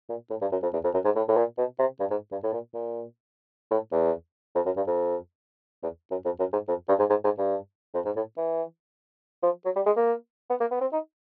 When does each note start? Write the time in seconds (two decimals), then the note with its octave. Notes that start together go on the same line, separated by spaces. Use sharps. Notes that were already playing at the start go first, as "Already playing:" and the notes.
0.09 A#2
0.30 A2
0.41 G2
0.52 F#2
0.62 F2
0.73 E2
0.84 F2
0.94 F#2
1.05 G#2
1.16 A2
1.28 A2
1.37 A#2
1.58 B2
1.79 C3
2.00 G2
2.11 G#2
2.32 G2
2.43 A2
2.53 A#2
2.74 A#2
3.71 A2
3.92 E2
4.55 F2
4.65 F#2
4.76 G2
4.87 F2
5.83 E2
6.11 F#2
6.25 F2
6.39 F#2
6.53 G#2
6.68 F2
6.88 G2
6.99 G#2
7.10 G#2
7.24 G#2
7.38 G2
7.94 F2
8.05 G#2
8.16 A2
8.37 E3
9.43 F3
9.65 F#3
9.76 G3
9.86 G#3
9.96 A#3
10.50 B3
10.60 A#3
10.71 B3
10.81 C4
10.92 D#4